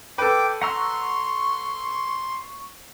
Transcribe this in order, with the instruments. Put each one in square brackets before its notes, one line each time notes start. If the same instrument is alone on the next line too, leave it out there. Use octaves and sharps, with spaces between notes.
[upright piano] A4 B4 [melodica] G5 D6
[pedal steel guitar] F#5 A#5 E6 [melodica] C6 [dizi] C#6